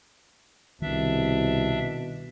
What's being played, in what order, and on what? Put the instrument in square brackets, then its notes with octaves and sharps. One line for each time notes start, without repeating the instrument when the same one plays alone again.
[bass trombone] C2 [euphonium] B2 [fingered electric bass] D#3 [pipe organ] D4 E5